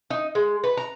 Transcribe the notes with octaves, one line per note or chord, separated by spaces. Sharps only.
D#4
G#3
B4
A#5